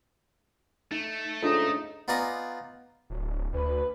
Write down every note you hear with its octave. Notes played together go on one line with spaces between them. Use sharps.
A3 D#4
G#2 C#3 D4 D#4 F4 A4
B3 D#4 F4 D5 G#5 A#5
D1
D2 B4